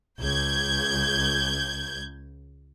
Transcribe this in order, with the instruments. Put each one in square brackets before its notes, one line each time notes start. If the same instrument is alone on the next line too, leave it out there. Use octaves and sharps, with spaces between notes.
[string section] C#2 G6 G#6